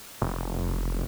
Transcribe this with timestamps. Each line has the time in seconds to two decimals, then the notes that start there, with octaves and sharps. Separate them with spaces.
0.22 F1